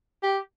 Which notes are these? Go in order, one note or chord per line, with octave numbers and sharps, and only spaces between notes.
G4